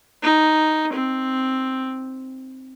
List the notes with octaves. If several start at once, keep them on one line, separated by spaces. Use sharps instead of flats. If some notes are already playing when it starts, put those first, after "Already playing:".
D#4
C4